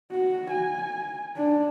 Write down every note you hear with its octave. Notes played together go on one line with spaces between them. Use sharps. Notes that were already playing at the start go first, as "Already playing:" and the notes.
F#4
G#5
D4